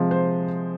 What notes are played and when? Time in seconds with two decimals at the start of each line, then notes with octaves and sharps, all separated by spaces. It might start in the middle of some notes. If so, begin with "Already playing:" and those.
Already playing: C3 F3 G#3
0.11 C5